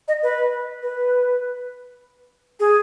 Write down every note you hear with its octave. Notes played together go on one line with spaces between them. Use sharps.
D#5
B4
B4
G#4